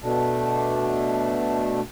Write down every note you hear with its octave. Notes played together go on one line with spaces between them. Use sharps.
B2 A3 D4